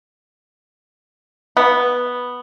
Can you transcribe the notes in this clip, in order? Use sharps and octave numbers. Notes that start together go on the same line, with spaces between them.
B3